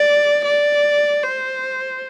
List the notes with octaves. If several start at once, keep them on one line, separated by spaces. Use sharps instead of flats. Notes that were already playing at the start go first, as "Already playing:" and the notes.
Already playing: D5
D5
C5